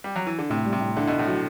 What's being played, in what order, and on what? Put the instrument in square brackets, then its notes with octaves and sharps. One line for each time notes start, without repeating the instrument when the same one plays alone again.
[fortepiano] G3
F#3
E3
D3
[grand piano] A2 [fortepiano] C3
[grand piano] G3
[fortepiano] C3
[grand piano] A2
[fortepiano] D3 [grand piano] E4
[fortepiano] B2 [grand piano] E4
[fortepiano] A2
[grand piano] F#3